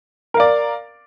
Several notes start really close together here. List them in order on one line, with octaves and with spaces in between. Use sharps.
A#4 F5 D5